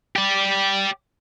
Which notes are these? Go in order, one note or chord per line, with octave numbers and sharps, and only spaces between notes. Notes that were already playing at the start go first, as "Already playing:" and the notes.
G4 D5